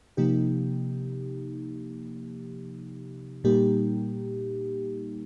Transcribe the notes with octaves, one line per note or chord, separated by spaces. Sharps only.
C3 F3 A#3 D#4 G4
A#2 G3 A#3 D#4 G4